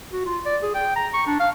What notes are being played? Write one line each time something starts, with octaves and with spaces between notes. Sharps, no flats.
F#4
F4
D5
G#4
G5
A#5
C#6
D4
F5